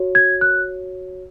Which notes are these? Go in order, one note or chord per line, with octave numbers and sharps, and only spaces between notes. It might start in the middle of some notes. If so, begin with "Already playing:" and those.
Already playing: F#4 C#5
G#6
F#6